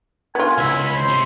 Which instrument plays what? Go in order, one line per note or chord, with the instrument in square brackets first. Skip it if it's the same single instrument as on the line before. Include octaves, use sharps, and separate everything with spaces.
[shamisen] B3 F4 [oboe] G#5
[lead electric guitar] C#2 [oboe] E4
[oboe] B5
C5
[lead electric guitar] C3